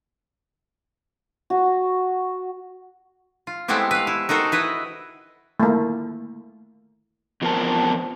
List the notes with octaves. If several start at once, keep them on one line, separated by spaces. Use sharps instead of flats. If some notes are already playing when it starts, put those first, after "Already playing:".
F#4
F4
G#3 A3 B3 C4 E4 G4
B4 F5
E4
D#4 F#4 A4 A#4 C5
E4 B4 D#5
A3 A#3
E2 F3 B3 C4 A#4 A5